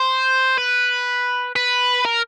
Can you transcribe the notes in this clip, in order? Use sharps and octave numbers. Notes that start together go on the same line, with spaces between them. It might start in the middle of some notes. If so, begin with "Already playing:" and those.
Already playing: C5
B4
B4
A#4